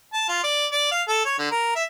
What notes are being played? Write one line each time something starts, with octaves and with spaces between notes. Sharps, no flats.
A5
F4
D5
D5
F5
A4
C#5
D3
A#4
E5